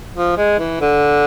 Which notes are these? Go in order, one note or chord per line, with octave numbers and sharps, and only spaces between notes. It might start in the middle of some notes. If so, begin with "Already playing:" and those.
F3
G#3
E3
D3